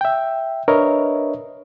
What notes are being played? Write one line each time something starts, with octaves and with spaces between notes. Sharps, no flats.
E5 G5
D4 A#4 B4 C#5 D#5 E5